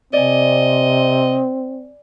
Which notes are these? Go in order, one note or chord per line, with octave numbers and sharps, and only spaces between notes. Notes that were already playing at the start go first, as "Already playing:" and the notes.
C3 C4 D5 D#5 G#5